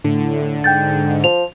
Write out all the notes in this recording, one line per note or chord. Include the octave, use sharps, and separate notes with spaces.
A2 D3
G#2 G5 G6 A6
F3 F7